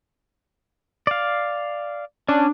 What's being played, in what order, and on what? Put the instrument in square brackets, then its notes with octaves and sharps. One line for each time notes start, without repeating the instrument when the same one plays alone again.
[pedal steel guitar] D5 F5
[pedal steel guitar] C#4 [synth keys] D4